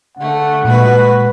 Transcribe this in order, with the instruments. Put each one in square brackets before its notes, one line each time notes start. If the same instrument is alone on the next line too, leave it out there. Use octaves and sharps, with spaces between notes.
[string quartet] D3 A3 [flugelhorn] F#5
[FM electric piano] A#2 [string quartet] G#3 F#4 B4